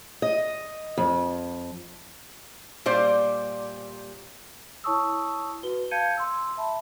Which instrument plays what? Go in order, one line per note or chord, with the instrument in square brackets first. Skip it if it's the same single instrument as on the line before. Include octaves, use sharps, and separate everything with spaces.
[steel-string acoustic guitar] D#5
F2
[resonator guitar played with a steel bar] A#2 G3 C5 D5
[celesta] E4 C#5 A5 C#6 D#6 E6
F#4 B4 G7
F5 A5 G6 G#6 C#7 D#7
C6 E6
E5 A5 B5